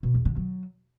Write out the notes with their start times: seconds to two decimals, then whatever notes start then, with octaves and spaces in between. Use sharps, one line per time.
0.03 B2
0.14 E2
0.25 D3
0.36 F#3